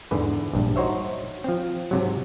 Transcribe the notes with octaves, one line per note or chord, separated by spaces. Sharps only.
E2 G#2 D3 B4
A#1 G2
D#4 F#4 C5 C#5 E5
F3 C4
G#2 C3 F#3